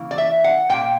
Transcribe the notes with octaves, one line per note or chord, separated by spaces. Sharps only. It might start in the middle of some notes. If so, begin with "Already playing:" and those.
Already playing: C#3 E3 A#3
D5
E5
F#5
A#2 A#3 G5